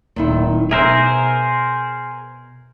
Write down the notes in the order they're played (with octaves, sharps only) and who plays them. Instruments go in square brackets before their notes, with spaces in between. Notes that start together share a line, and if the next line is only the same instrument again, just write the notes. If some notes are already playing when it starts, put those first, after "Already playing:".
[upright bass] D1 [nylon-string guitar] A#2 D#3 E4
[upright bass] B2 [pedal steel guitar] G#4 A#4 C5 [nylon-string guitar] E5